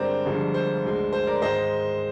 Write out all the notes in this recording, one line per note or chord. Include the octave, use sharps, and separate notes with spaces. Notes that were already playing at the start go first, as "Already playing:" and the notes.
Already playing: G2 D3 G#3 C4 A#4 C5 D5
G1 G2 D3 F3 G#3
C5
D2 D3 G#3
C5
A#4 D5
G#2 D#3 G#3 C5 D#5